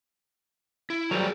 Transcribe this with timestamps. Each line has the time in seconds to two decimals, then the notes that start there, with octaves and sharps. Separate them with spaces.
0.90 E4
1.11 F#3 G3 G#4 A#4 C5